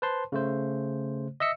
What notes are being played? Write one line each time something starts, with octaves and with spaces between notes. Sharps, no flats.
B4 C5 A5 C6
C#3 A3 C5
D#5 E5 E6 C#7